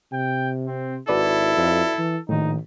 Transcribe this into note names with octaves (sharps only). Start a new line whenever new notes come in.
C3 G5
C4
G#1 E4 F#4 A4 B4 D5
F2
E3
A#1 A2 D#3 D#4